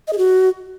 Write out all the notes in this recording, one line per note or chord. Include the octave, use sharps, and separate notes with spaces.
D#5
G#4
F#4